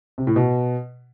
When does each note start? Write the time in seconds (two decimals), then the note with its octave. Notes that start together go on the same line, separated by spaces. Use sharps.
0.18 C3
0.27 A2
0.36 B2